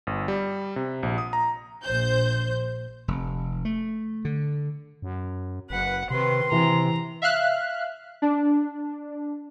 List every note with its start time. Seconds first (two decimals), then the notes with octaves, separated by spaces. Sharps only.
0.07 G1
0.28 G3
0.76 C3
1.03 A#1
1.18 D#6
1.33 A#5
1.83 A#1 C5 G6
3.08 F1
3.65 A3
4.25 D3
5.02 F#2
5.70 F#1 B4 F#5
6.10 C3 D#3 B4 C6
6.52 C3 E3 A#5
7.22 E5 F5 F6 F#6
8.22 D4